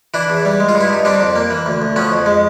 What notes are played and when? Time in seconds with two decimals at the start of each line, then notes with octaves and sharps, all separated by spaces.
0.14 E3 D4 E4
0.30 E2
0.45 G3
0.60 G#3
0.68 F4
0.75 G2
0.81 E4
0.90 G2 D#4
1.05 G3 C4 D4
1.20 F2
1.36 A#3
1.51 E3
1.66 D2
1.82 D2
1.96 F3 B3 C#4
2.12 F2
2.26 G#3